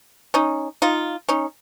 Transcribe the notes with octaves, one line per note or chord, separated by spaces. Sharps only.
C#4 D#4
D#4 F4
C#4 D#4